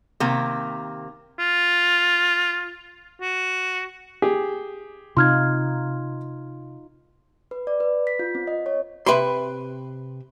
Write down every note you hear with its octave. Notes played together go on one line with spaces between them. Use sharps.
C3 D#3 A#3
F4
F#4
G4 G#4
C3 D#4 F4 C6 F6 G#6
B4
D5
B4
B6
F4
C4
D#5
C#5
C3 B4 E5 G5 B5 C6